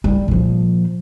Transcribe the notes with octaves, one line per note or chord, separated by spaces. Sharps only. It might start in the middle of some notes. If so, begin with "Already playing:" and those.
G3
A#2 F3